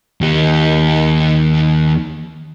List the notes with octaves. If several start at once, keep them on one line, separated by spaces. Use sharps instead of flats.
D#2 G4